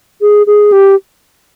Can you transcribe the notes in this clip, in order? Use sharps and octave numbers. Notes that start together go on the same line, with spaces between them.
G#4
G#4
G4